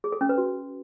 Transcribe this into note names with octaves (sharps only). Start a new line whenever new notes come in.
G#4
A4
C#4
B4
F#4